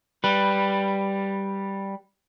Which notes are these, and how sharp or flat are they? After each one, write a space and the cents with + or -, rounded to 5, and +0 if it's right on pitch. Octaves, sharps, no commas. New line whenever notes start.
G3 +0 B4 +0